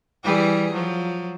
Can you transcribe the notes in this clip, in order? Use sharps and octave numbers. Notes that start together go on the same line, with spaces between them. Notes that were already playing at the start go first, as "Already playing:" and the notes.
E3 G3 G#4
F3 F#3